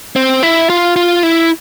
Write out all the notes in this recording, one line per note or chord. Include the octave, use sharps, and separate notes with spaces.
C4
E4
F4
F4
E4